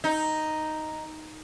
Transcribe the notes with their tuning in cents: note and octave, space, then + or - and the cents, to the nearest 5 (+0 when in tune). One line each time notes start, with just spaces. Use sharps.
D#4 +0